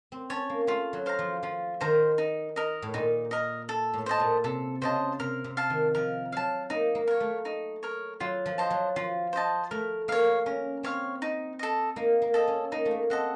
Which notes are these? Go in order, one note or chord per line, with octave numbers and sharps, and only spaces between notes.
C4
C#4 C#5 A5
A#3
A3 F4
F#3
C5 F5 A#5
F3
F3 F4
D#3 C5 F5 A#5
D#4
A#4 D#5
A2
A#2 D#4
A#4 D#5
A4
A2
C5 D#5 A5
A#2
C3 A4
C#3 C5 D#5 A5
C3 A#4
C3
F5 A5
D#3
F3 A#4
F#3 F5 A5
A#3 D#4
A#3
A#4 C#5
A3
D#4
A#4 C#5
F#3 F4
F3
C5 D#5 A5
F#3
F3 F4
C5 D#5 A5
A3 A#4
A#3 C#5 F5
C#4 A#4
C4 C#5 F5
D#4
A4 D#5
A#3 D#4
A#3
A4 D#5
C#4
A#3 D#4
A3
A#3
C4 A4 D#5 F#5